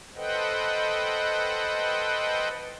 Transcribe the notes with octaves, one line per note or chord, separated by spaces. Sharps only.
A4 B4 C5 D#5 F#5 G5